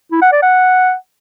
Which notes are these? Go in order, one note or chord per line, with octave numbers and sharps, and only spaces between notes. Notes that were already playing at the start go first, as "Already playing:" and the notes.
E4
F#5
D5
F#5